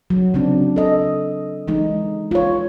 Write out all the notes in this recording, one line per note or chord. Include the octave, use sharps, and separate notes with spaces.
F#3
C#3 F#3 C4 D4
A4 D#5
E3 G#3 D#4
F4 C#5